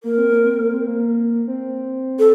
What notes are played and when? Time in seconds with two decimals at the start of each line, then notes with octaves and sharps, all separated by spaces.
0.04 A#3 A#4
0.18 C4
0.32 A#3
0.46 C4
0.60 A#3
0.74 C4
0.87 A#3
1.48 C4
2.19 A4